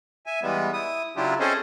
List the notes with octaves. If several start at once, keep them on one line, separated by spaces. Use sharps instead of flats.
E5 G#5
E3 G3 G#3 B3
E4 D#6
C#3 F#3 D4 E4 F4 G4
C4 C#4 G#4 A4 C5 D#5